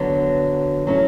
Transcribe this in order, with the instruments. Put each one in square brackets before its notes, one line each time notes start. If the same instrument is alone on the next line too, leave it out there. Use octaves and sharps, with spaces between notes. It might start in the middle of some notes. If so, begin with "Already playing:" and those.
Already playing: [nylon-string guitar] D3 F#3 B3
F#3 C#4 E4 A4